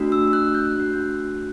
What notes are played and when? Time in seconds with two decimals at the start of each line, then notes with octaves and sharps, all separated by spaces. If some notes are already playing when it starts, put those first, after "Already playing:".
Already playing: A3 D4 F#4
0.12 E6
0.27 E6
0.33 F#6
0.55 G6
0.76 A3 D4 F#4 F#6